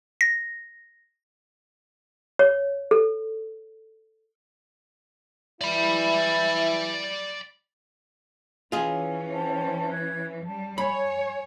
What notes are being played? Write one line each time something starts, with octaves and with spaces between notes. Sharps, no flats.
A#6
C#5
A4
E3 E4 D5 B5
E3 C#4 F4 G#4
C5 G5 A5
F#6 G#6
G3 A5
C#5 G#5 B5